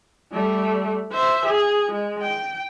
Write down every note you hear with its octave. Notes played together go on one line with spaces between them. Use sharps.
G3 A3
C5 E5
G#4
G#3
G5